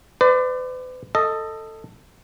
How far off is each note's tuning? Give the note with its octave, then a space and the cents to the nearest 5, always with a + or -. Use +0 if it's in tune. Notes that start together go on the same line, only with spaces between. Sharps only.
B4 +45 D5 +20
A4 +15 D#5 +0